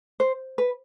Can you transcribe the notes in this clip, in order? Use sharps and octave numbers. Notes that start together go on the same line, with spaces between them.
C5
B4